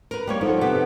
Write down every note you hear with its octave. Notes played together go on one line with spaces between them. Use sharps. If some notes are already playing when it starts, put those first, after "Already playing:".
A#4 B4
G3 A#3 C#5
F3 D#4 A4 F#5
C3 B3 G4